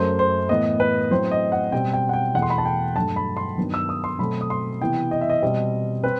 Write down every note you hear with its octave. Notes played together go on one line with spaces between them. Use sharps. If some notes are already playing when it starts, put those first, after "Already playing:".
Already playing: F#2 F#3 A3 C5
C5
A2 E3 B3 D#5
B4
A2 F#3 C4 C5
D#5
F#5
B2 G3 C4 G5
G5
F#5
G5
E2 B2 A3 F#5
C6
B5
A5
G5
G2 F#3 A3 A5
B5
C6
G2 D#3 F#3 B3
E6
D#6
C6
B2 F#3 A3 C4 B5
D#6
C6
C3 E3 B3 G5
D#5
E5
D#5
B2 G3 C4 D#5
C4 B4